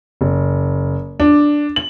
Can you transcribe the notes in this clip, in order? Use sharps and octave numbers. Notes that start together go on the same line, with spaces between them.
F#1
D4
F#7